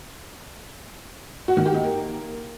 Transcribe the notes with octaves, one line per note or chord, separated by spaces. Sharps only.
F#4
D#3
G4
D#4
A#3